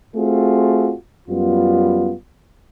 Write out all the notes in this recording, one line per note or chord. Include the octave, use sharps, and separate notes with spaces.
A3 C4 F4 F#4 G#4
F#2 G3 B3 F4